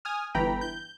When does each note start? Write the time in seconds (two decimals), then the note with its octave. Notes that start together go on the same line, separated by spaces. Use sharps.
0.05 G#5 D#6 F6
0.35 G1 E3 G5 A#5 B5
0.61 G6